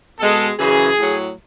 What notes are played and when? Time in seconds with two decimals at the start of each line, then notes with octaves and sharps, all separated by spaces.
0.19 B2 G#3 A4
0.59 F#2 C#3 E3 G#4
0.98 A2 F#3